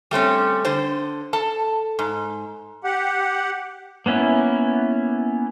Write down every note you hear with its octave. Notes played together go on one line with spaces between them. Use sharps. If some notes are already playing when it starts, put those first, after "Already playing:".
G3 A3 C4 C#4
D3 C5
A4 A5
G#2
G4 F#5
A#3 B3 C#4 E4